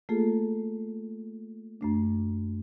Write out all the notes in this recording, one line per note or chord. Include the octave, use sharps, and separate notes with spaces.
A3 A#3 F4 G#4 A4
F#2 A3 D4